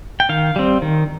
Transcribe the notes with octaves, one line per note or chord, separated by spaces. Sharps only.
G5
D#3 F5
G3 C4
D#3